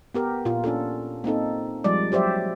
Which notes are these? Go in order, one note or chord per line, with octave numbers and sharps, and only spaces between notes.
B3 G4 A#4
A#2 F4
C#4 D4 F4 A4
A#3 C4 D#4 A4
F3 G3 G#3 D5
F#3 G4 C5 D5 E5